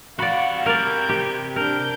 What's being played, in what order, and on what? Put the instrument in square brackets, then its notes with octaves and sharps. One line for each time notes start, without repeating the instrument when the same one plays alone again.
[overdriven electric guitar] C3 B5 [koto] F#4 D5 [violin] F5 F#5
[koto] A#4 D5 [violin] G6 G#6
[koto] G4
[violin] D4 G6 [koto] A#4